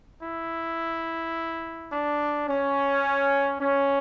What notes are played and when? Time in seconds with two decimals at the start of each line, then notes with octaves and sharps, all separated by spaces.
0.23 E4
1.92 D4
2.48 C#4
3.61 C#4